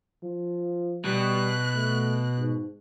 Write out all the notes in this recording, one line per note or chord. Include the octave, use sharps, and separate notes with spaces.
F3
B2 G3 F#6
A3
G#2